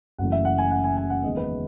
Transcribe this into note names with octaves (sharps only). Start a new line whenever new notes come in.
F#1 F#2 E3 A3 F#5
E5
F#5
G#5
F#5
G#5
G#5
F#5
F#1 E2 D#3 G#3 B3 D#5
B4